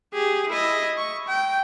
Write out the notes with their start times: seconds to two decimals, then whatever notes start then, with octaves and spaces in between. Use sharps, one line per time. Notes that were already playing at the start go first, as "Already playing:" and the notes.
0.14 G4 G#4
0.49 E4 D#5
0.98 C#6
1.28 G5